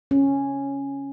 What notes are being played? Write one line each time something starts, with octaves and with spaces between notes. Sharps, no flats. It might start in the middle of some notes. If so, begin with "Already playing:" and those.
C#4